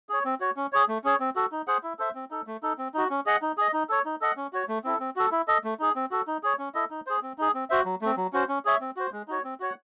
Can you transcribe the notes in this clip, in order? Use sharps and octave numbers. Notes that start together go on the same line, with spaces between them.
G#4 C#5
C4
F#4 C#5
C#4
G#4 C#5
A3
C#4 G#4 C#5
C4
F#4 A4
D#4
G#4 C5 F#5
E4
A4 C5 E5
C4
D#4 A4
A3
D#4 A4
C4
D#4 F#4
C#4
G#4 D#5 F#5
D#4
G#4 D#5
D#4
A4 C#5
D#4
A4 D#5 F#5
C#4
F#4 C#5
A3
C4 E4 A4
C4
F#4 A4
E4
A4 D#5
A3
D#4 G#4
C4
F#4 A4
D#4
G#4 C#5
C#4
E4 A4 D#5
D#4
G#4 C5
C4
D#4 G#4
C4
F#4 C5 E5
F#3
A3 C4
F#3
C#4 F#4 C5
C#4
G#4 C#5 E5
C4
F#4 C5
G#3
D#4 F#4 C#5
C4
F#4 C#5 F#5